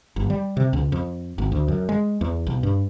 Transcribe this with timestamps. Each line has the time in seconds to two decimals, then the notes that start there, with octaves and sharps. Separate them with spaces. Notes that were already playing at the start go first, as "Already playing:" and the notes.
0.16 G1
0.30 G3
0.57 C3
0.73 C#2
0.92 F2
1.38 G#1
1.52 D2
1.68 F#2
1.89 G#3
2.21 E2
2.47 B1
2.63 G2